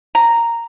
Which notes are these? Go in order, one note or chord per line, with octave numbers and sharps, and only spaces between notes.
A#5